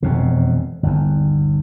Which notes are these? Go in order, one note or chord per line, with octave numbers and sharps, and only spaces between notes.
E1 F2 C3
G1 D#2